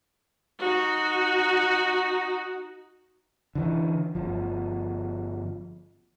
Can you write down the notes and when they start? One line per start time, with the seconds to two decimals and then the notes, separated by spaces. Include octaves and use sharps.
0.59 D#4 F#4
3.55 D3 E3
4.15 G1 F3